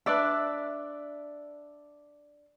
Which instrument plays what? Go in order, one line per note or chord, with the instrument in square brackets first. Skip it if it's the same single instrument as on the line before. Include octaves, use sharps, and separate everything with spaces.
[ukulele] D4 B4 D5 E5